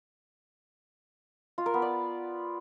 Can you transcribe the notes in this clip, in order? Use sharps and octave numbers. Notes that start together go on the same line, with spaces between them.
F4
A#4
B3
D5